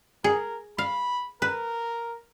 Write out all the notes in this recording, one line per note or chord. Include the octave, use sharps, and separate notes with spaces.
G#4 A#4
F5 B5
A#4 B4